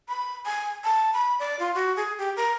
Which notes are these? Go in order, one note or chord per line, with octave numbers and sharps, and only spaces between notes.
B5
G#5
A5
B5
D5
F4
F#4
G#4
G4
A#4